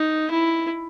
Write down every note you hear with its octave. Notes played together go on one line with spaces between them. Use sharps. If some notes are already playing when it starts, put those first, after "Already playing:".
Already playing: D#4
E4